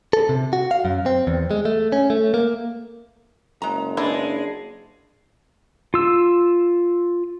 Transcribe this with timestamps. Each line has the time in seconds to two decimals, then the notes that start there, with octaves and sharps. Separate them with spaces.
0.13 A4
0.29 C3
0.53 F#4
0.71 F5
0.85 F#2
1.06 C4
1.27 E2
1.51 G#3
1.65 A3
1.92 C#4
2.10 A3
2.34 A#3
3.62 F#1 G#3 A#5
3.97 G#3 B3 D4 E4
5.94 F4 E6